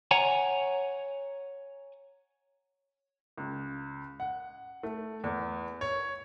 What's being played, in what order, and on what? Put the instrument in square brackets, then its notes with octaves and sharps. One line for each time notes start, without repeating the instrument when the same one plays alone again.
[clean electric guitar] C#5 F#5 G#5 A#5
[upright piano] C#2
F#5
A3
E2
C#5